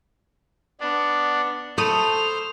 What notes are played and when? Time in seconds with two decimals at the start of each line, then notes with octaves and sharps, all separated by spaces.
0.80 B3 D4
1.78 A3 A4 C5 B5 D#6 F7